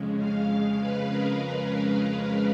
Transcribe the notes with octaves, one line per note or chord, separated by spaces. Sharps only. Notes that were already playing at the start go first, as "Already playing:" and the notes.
Already playing: F2 C#3 G#3
F5
B4
A#4